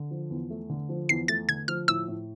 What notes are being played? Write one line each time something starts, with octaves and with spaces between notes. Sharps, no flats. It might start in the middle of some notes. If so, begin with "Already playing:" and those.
Already playing: D3
F3
E2
A3
D3
F3
E2 C7
A3 A6
D3 G#6
F3 F6
A2 E6
A2